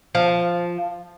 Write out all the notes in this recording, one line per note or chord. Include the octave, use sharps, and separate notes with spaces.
F3